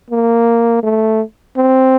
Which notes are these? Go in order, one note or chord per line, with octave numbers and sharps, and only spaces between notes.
A#3
A3
C4